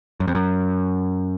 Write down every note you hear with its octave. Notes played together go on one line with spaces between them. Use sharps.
F#2
F2
F#2